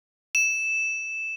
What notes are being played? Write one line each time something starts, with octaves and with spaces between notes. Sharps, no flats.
E7